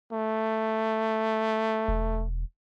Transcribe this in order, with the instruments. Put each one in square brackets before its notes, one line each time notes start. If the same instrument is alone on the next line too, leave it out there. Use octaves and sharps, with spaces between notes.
[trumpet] A3
[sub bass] E1